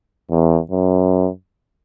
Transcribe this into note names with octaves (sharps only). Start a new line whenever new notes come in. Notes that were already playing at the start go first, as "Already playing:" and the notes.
E2
F#2